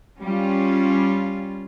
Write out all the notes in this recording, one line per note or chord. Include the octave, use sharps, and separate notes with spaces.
G3 C#4 F4